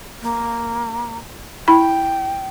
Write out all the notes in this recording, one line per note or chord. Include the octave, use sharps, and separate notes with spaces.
A#3
E4 G5 B5